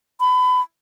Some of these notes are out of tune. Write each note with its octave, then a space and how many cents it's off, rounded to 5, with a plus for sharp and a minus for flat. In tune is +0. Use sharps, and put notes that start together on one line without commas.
B5 +30